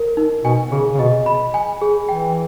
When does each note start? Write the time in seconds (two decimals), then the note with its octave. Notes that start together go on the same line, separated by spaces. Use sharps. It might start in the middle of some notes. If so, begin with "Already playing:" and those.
Already playing: A#4
0.17 D#4
0.44 B2 G#5
0.72 C#3 G#4
0.94 C#3
0.99 B2 D#5
1.26 B5
1.54 G#5
1.82 G#4
2.08 E3 G5